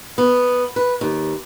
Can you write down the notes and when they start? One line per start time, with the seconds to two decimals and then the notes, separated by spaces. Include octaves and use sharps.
0.18 B3
0.76 B4
1.01 D#2